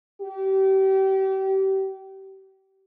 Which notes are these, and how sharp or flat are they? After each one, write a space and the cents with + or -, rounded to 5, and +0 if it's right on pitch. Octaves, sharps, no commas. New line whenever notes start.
G4 -30